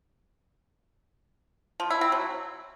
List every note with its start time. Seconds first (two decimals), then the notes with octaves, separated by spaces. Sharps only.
1.80 F3
1.90 E4
2.01 C4
2.12 F#3